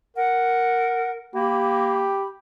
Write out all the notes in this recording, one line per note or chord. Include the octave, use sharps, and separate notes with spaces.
A#4 F#5
A#3 G4 B5